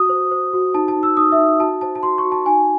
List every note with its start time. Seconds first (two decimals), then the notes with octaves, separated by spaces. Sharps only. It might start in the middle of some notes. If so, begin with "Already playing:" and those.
Already playing: F#4 D#6
0.09 C5
0.31 C5
0.53 F#4
0.74 D#4 A5
0.88 A5
0.96 D#4
1.03 E6
1.17 D#4 D#6
1.32 E5
1.38 D#4
1.60 F#4 A5
1.81 C5 A5
1.95 A5
2.03 F#4 C6
2.18 C#6
2.24 F#4
2.32 A5
2.46 D#4 G#5